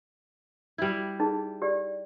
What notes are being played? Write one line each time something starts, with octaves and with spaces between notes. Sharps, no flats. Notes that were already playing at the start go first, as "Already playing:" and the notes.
G3 E4
D#4 G#4
G4 D5